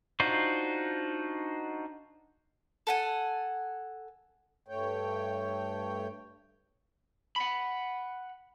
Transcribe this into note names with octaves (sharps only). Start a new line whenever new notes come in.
D4 D#4 F4 F#4 C5
A4 F#5 G#5
G2 A3 C#5 G5
F#5 B5